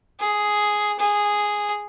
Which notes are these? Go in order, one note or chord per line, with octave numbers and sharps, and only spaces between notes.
G#4
G#4